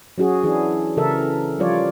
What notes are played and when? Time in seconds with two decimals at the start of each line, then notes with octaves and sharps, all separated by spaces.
0.18 F#3 C#4 F#4 G#4
0.44 E3 D4 E4 G#4
0.97 C#3 E3 A4 A#4 E5
1.59 F3 G3 F4 A4 C#5 D5